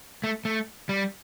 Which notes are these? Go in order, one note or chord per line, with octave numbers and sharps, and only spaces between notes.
A3
A3
G3